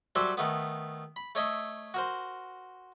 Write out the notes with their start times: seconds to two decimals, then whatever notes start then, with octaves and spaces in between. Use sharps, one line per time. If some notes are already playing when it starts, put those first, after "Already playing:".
0.16 F#3 G3 F#4 A4 C5 E5
0.37 D#3 A3 B3
1.16 B5
1.35 A3 C#5 D#5 E5
1.94 F#4 A#4 C5